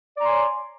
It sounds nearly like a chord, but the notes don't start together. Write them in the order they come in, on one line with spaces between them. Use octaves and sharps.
D5 A#5 C6 G#5 C#5